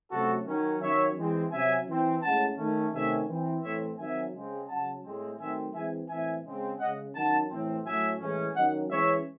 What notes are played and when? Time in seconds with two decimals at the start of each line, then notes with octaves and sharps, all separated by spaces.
0.11 C3 F#3 A3 C#4 F#4 A4
0.47 D#3 F#3 C#4
0.81 D#3 F#3 C#4 C#5 E5
1.17 E3 G#3 C4
1.52 C3 F#3 C#4 E5 G#5
1.87 E3 C4
2.22 A2 G#3 C#4 F#5 A5
2.57 D#3 A3 C#4
2.93 C3 D#3 A3 C#4 E5 G#5
3.28 E3 C4
3.63 A2 E3 A3 C4 C#5 E5
3.98 D#3 F#3 C4 E5 G#5
4.33 C#3 G#3 C4
4.68 C#3 F#3 C#4 F#5 A5
5.04 A2 G#3 C4
5.39 D#3 F#3 A3 C4 E5 G#5
5.74 E3 G#3 C4 E5 G#5
6.09 A2 E3 C4 E5 G#5
6.44 C#3 G#3 C4
6.79 C#3 G#3 C#4 D#5 F#5
7.15 D#3 F#3 C#4 F#5 A5
7.50 A2 E3 A3 C4
7.85 A2 F#3 A3 C#4 E5 G#5
8.20 A2 E3 G#3 C#4
8.55 D#3 F#3 C#4 D#5 F#5
8.90 E3 G#3 C#4 C#5 E5